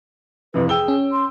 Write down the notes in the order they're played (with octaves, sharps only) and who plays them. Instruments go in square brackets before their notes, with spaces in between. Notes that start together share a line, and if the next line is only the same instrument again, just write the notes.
[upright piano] F2 C3 E3 [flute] B4
[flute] G#4 [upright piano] G5 E6 G7
[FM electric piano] C#4
[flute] C6